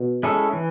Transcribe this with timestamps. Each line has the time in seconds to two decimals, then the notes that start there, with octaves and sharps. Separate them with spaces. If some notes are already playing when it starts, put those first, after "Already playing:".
Already playing: B2
0.23 G#3 C#4 E4 A4
0.53 E3